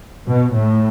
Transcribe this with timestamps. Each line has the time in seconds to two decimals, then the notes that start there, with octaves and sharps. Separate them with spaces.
0.27 B2
0.55 A2